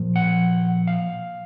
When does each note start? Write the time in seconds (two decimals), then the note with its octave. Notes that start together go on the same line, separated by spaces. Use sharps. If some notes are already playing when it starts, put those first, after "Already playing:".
Already playing: A#2 F3
0.16 F#5
0.87 F5